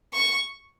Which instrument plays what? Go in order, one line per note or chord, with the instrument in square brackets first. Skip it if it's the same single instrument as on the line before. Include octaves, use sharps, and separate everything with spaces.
[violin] C#6